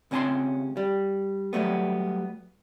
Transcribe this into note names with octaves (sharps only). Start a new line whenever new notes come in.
C#2 C3 C#4 G#5 A5 C6
G3
F#3 G3 A3 B3